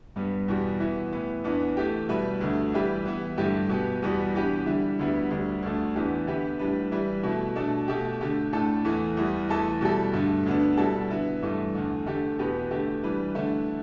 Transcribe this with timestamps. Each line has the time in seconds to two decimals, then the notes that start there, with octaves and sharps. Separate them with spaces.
0.16 G2 G3 B3
0.48 E2 B2 G3 B3
0.80 E3 B3 E4
1.12 A2 E3 B3
1.44 E2 E3 B3 D4
1.77 E3 A3 G4
2.09 B2 G3 E4 B4
2.41 D2 D3 A3
2.73 E3 G3 E4 G4 B4
3.05 E3 B3 E4
3.37 G2 D3 A3 E4 G4
3.69 B2 B3 G4
4.02 E2 B2 G3 B3
4.34 E3 B3 D4 G4 B4
4.66 D3 G3 E4
4.99 D2 D3 G3 B3 E4
5.31 D2 D3 G3
5.62 D2 D3 A3 D4
5.95 E2 E3 B3 D4 G4
6.27 D3 B3 E4 G4 B4
6.59 A2 G3 D4 B4
6.91 E3 G3 E4 B4
7.23 B2 A3 E4
7.56 B2 A3 D4 A4
7.88 B2 A3 G4
8.21 D3 A3 G4
8.53 A2 A3 D4 A4
8.85 E2 E3 A3
9.17 E2 E3 G3
9.49 E2 E3 A3 E4 A4
9.81 B2 G3 E4 A4
10.13 G2 D3 A3
10.46 D2 D3 B3 D4
10.77 B2 G3 E4 A4
11.10 D3 B3 E4
11.42 G2 E3 A3
11.75 E2 D3 A3
12.06 D3 A3 G4
12.39 E2 B2 B3 G4 B4
12.71 D3 A3 G4
13.03 E3 G3 D4 B4
13.35 D3 A3 E4